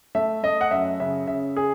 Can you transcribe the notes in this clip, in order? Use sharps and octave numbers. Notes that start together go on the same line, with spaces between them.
A3 E5
A3 D#5
F#5
F#2 E5
C#3 E5
C#3 E5
G#4